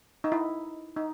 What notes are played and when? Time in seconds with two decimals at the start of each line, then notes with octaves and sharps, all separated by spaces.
0.24 D#4
0.32 E4
0.96 D#4